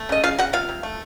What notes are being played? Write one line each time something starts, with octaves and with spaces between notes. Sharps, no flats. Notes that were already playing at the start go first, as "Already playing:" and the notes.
Already playing: A3
C#3 D#5
C#3 F4 F5
C#3 F#4 F#5
C3 F4 F5
C3
A3